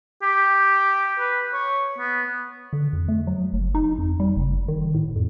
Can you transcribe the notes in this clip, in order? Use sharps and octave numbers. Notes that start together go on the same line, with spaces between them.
G4
B4
C#5
B3
D3
F2
A3
F#3
F#1
D#4
F2
G3
F#1
D#3
A2
F2